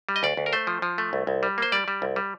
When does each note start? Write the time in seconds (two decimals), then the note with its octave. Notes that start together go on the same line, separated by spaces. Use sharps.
0.09 G3
0.16 D#5
0.23 D2 D5
0.37 D2
0.46 A#4
0.53 A3 C5
0.67 F3
0.82 F3
0.98 A3
1.13 C2
1.27 C2
1.43 G3
1.58 A#3 C5
1.72 G3 D5
1.88 G3
2.02 C2
2.16 G3